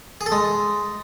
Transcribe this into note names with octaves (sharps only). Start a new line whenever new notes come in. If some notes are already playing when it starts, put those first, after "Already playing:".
G#4
A4
G#3